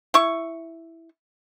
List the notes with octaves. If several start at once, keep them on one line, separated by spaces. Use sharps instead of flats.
E4 C#6